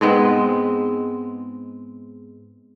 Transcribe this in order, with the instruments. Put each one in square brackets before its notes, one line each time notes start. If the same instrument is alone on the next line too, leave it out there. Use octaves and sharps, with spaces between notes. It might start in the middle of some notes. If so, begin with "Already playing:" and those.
[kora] G#2 G#3 B3 C4